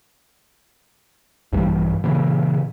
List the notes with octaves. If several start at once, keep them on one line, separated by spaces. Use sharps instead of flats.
A#1 G2 E3 G3
A#2 C#3 E3